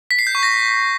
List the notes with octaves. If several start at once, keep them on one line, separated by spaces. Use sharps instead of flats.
B6
C7
G6
C#6
A#6